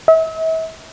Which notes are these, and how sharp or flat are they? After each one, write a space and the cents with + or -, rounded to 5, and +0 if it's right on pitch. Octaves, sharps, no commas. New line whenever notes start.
E5 -40